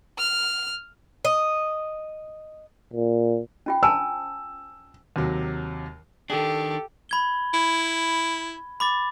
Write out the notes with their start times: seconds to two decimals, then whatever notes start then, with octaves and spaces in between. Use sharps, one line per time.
0.18 F6
1.25 D#5
2.93 A#2
3.66 C#4 F4 G5
3.83 C5 G#5 A5 E6
5.16 D#2 C3 F#3
6.30 D#3 D4 G4 A4
7.09 B5 G#6 G7
7.54 E4
8.80 B5 D6 A6